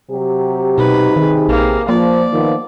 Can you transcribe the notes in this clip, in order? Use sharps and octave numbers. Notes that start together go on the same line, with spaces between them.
C3 F#3 G4
B2 D#4 B4
C3 D#3 G4 G#4
A#1 A#3
F3 A#3 D5
D#3 F3 B3